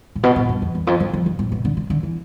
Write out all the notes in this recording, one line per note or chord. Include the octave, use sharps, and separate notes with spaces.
A2
B2
A2
G2
F2
E2
F2
G2
F2
G2
A2
B2
D3
C3
D3
E3